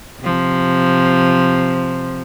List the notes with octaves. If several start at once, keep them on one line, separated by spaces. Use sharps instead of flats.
C3 F3